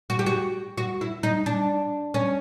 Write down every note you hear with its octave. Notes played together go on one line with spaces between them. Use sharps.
F#4
G4
F#4
F#4
E4
D#4
D4
C#4